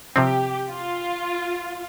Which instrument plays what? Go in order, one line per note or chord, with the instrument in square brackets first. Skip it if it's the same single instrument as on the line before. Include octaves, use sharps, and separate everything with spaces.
[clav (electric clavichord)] C3 F3 C4 [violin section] G4
[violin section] F4